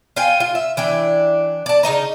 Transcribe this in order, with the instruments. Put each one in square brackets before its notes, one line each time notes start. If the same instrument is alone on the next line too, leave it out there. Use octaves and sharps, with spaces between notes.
[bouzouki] F4 F5 G5 G#5
F4
E5
E3 D4 G5
D5 A5
C#3 D#4 D#5 A#5